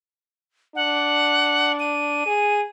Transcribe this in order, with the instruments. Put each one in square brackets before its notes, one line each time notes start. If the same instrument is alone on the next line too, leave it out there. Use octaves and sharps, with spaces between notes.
[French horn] D4 [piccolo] F#5
[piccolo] D#7
[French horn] G#4